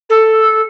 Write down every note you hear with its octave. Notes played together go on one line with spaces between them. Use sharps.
A4